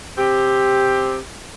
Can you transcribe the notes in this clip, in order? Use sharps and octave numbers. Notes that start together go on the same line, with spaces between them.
C3 C4 G4